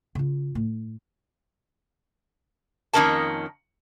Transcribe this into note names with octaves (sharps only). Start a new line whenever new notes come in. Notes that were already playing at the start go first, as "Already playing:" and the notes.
C#3 F4
A2
F2 D#3 A#3 C#4 A#4 A5